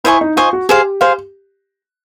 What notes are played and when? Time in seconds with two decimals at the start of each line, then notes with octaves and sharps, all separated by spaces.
0.04 E4 C5 D#5 G#5 C#6
0.21 D#4
0.36 F4 C5 D#5 G#5 C#6
0.53 F#4
0.69 G4 G#4 C5 F5
1.01 G#4 C5 F5